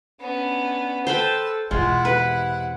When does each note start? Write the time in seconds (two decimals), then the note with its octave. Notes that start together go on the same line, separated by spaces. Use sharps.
0.20 B3 C#4 D4
1.07 A4 B4 C5 G5 A5 B5
1.71 E2 B2 G#3 E4 F4 F#5
2.05 C3 B4